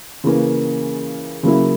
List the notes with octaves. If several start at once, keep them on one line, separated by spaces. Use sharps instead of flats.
C#3 E3 A#3 C#4
C#3 F#3 A#3 E4